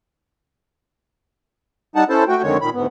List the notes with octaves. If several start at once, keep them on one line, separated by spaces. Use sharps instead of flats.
G3 D#4 F#5 A5
C#4 E4 A4 C5 A5
A3 F#4 G5
F2 D3 D#3 G#3 C#5
A#2 D#3 B5
D2 G#2 B3